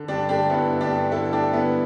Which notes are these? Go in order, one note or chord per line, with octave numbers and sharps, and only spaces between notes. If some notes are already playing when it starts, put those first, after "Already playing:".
Already playing: D3
G2 D4 G4
D3 D4 G4
G2 B3 E4
D3
D4 G4
G2
D3 E4 A4
G2 D4 G4
D3 B3 E4